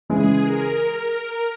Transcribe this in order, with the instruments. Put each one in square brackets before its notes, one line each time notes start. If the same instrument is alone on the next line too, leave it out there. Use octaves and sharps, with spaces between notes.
[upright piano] C#3 E3 G#3 [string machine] G#4
[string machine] A#4